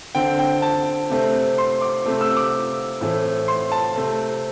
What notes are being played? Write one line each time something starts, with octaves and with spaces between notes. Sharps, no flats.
D3 C4 G5
G5
A5
C3 A3 C4
C6
D6
C3 A3 C4
E6
D6
A2 E3 A3 C4
C6
A5
C3 A3 C4